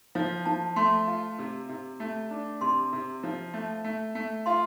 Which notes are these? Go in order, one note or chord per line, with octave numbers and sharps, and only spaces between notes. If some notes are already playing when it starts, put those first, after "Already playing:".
F3 F5
F3 A5
A3 C6
F4
C3
C3
A3
D4
C3 C6
C3
F3
A3
A3
A3
F4 C6